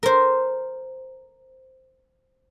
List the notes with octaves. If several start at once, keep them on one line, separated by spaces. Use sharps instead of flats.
A#4 C5